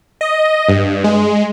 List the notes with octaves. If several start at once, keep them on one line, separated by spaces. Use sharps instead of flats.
D#5
G2
G#3